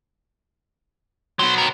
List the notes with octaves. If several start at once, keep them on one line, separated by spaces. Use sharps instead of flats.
F#3 B3 C5
G4 A#4